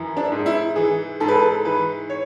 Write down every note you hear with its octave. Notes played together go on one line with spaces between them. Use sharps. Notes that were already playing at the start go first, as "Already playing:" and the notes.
Already playing: F#2 E3
D4
G#2
E4
E3 G#4
G#2 A4
B4
A4
E3 B4
C#5